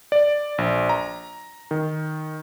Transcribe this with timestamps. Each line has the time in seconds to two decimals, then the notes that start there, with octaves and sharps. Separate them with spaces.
0.12 D5
0.58 A#1
0.89 A#5
1.71 D#3